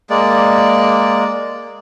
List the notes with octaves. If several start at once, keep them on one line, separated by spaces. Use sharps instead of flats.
G#3 A#3 D5